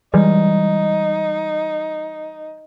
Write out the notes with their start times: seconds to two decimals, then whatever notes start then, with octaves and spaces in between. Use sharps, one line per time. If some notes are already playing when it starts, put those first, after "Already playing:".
0.14 E3 G3 G#3 D#4